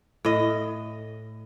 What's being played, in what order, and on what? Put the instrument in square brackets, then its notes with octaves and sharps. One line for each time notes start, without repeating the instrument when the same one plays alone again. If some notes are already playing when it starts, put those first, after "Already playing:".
[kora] A2 D#5